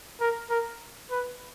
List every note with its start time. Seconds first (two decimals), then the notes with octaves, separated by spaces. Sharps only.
0.20 A#4
0.50 A#4
1.11 B4